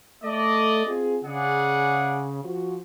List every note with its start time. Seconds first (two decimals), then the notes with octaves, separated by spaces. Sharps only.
0.23 A3 D5 D#5
0.86 C4 F4 G#4
1.24 C#3 G#4 D5 F#5
2.44 F3 F#4